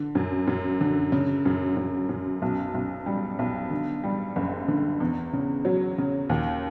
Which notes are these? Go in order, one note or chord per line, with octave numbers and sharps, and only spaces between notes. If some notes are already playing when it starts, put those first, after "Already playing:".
Already playing: D3
F#2
F#2
D3
C#3
F#2
F#2
F#2
B1
B1
G3
B1
D3
G3
F#1
D3
E2
C#3
F#3
C#3
D#2